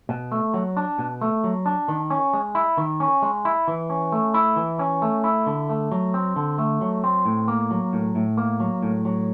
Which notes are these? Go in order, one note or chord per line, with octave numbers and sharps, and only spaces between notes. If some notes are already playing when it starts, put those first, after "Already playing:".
B2
A3
F#3
D4
B2
A3
F#3
D4
D#3
C#4
G#3
E4
D#3
C#4
G#3
E4
E3
C#4
A3
E4
E3
C#4
A3
E4
D3
A3
F#3
C4
D3
A3
F#3
C4
A2
A#3
F#3
A2
A2
A#3
F#3
A2
F#3